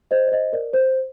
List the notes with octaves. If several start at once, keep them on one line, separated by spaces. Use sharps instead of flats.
C5 D#5
D5
C5 D#5
A#4 D5
C5